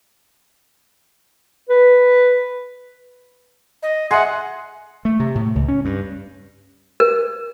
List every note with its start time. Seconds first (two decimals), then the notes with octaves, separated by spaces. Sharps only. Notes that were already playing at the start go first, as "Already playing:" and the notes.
1.69 B4
3.83 D#5
4.11 G#4 E5 F#5 C6
5.05 A3
5.20 C3
5.35 A2
5.55 C#2
5.68 C#4
5.85 G2
7.00 A#4